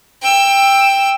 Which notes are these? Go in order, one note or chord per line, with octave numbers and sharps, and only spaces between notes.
G5 E6